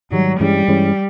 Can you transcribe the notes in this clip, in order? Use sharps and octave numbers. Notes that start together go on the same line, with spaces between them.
G#2 D#3 F#3 G3
G2 E3 G3 G#3 C#4
G2 E3 G#3 C#4